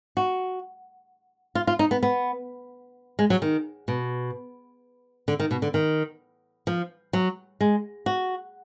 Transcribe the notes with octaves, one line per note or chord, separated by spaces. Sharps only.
F#4
F4
F4
D#4
B3
B3
G#3
F#3
D#3
B2
D3
D#3
B2
D3
D#3
F3
F#3
G#3
F#4